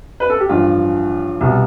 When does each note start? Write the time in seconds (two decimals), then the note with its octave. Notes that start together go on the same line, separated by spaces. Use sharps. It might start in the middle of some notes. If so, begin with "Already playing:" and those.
0.20 B4
0.30 A4
0.40 G4
0.49 A1 G2 F3 F4
1.41 C2 B2 G3